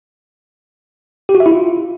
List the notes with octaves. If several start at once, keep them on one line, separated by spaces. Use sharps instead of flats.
G4
F#4
E5
E4
F4